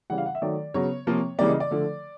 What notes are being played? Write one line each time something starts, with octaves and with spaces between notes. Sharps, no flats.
C#3 E3 G3 F#5
F5
F#5
E5
D#3 F#3 A3 D5
C#3 F#3 B3 C#5
C3 F3 A#3
C#3 E3 G3 A#3 D5
D#5
D5
D3 F3 A3